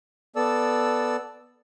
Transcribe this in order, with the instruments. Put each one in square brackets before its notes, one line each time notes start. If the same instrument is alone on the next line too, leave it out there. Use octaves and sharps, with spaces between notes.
[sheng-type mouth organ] B3 A4 D5 E6